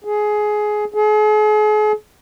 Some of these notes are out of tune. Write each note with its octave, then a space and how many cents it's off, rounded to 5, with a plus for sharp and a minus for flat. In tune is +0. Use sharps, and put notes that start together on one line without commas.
G#4 +15
G#4 +40